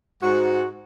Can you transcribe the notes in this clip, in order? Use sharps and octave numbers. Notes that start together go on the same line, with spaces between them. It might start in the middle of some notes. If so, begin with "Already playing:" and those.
G#2 F#4